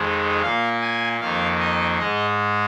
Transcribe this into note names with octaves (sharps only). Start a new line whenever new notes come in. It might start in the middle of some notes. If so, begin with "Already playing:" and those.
Already playing: F2 D#3 G#3
A#2 A#3 F5
G#5
F2 D#3 A#3 F5
D#5
G#2 G#3 D#5